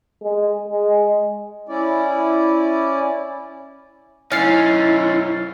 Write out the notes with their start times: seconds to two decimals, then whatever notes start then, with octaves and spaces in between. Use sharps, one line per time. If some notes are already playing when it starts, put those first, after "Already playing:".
0.23 G#3
0.68 G#3
1.69 C#4 E4 D5
4.32 F#2 C#4 D#4 E4 F6 A6 C7